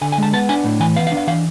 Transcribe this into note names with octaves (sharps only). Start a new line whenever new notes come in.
D3 G#5
G#5
G#3 A5
B3 A5
D4 G#5
A2
E3 G#5
B3 F5
F5
D4
F5
E3 F5